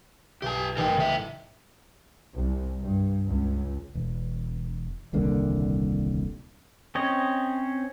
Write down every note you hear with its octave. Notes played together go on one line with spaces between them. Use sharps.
B1 G4 G#5 A5
A1 D#4 A#4 G5 G#5
C#3 E5
C2
G2
C#2
E1
D#1 C2 D3 A#3
C4 C#4 C#5 D#5